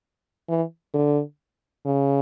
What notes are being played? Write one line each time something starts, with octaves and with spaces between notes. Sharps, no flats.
E3
D3
C#3